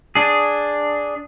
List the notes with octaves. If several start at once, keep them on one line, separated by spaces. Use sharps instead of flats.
D4 G#4